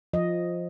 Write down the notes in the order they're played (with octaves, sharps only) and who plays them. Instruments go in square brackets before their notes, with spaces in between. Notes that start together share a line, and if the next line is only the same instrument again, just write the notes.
[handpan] F3 D#5